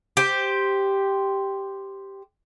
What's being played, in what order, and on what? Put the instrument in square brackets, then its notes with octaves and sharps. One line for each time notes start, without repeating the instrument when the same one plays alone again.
[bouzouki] G4 C5